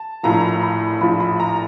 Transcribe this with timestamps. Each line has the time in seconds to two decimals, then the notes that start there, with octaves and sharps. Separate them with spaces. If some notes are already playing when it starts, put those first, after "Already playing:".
Already playing: A5
0.23 A#1 A2 F3 A#5
0.63 B5
1.01 A#1 A2 F3 B5
1.20 B5
1.40 A#5